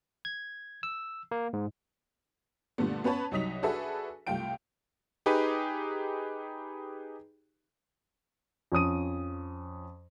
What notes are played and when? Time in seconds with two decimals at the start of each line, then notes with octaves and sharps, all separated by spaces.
0.25 G#6
0.83 E6
1.31 A#3
1.53 G#2
2.78 A#2 D3 G3 A3 B3
3.04 B3 C#4 B4 C#5 A5 B5
3.31 C2 F#3 D#4 D#6 B6 F7
3.62 D4 F#4 G#4 A4 B4 E5
4.27 C2 A3 F4 G5 D7
5.26 D#4 G4 G#4 B4
8.72 F2 C#4 D#6 D#7